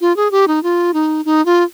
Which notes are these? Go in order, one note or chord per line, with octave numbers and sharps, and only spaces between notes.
F4
G#4
G4
D#4
F4
D#4
D#4
F4